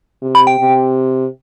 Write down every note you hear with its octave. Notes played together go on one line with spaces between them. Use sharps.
C3
B5
G5
C3